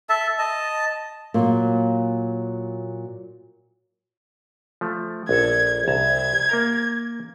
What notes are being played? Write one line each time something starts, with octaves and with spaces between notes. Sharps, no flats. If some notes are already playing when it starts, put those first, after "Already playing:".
A4 E5 A5
D#5 A5
A#2 F#3 A#3
F3 A3
A#1 A4 G#6
C2 A5 A#5 G#6
A#3 A#4 A#5